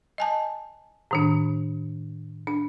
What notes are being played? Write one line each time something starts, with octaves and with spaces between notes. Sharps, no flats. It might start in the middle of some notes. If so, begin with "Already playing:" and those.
D#5 G#5 A5
A2 D#3 D4
D4